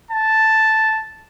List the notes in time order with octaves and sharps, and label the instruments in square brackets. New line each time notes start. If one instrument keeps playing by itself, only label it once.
[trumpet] A5